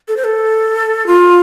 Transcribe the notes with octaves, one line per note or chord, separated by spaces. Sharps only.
A4
C5
A4
F4